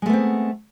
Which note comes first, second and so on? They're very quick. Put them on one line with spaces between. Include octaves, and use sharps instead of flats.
G#3 A3 B3 C4